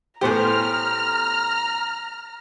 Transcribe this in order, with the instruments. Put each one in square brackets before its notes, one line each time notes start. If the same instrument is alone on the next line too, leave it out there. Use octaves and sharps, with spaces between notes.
[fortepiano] A2 B3 G4 [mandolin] G#4 C5 [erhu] A#5 [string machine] F6